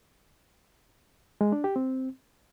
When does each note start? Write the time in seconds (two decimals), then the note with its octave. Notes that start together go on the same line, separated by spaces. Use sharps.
1.41 G#3
1.52 D4
1.64 G4
1.76 C4